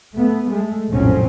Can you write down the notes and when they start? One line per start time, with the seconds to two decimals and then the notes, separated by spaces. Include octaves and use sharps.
0.12 A3 B3
0.48 G#3 A3
0.91 F1 A#1 A2 F#3 C4 C#4